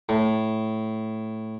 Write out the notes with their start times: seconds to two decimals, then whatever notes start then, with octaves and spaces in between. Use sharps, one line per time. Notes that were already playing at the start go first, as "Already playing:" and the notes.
0.09 A2